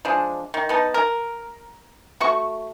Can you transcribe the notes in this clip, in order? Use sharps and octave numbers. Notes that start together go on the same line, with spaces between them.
F3 G#3 D4
D#3
B3 D#4 A5
A#4
A3 F#4 C#6